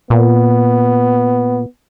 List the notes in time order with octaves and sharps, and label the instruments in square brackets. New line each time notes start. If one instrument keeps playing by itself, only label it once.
[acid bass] A#2 [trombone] B3